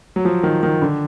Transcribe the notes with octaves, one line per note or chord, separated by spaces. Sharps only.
F#3
F3
D#3
D#3
D3